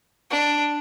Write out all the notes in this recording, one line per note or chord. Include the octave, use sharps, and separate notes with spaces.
D4